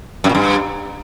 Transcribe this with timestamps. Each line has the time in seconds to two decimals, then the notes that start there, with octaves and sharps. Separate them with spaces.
0.24 F#2
0.29 A#2
0.35 G2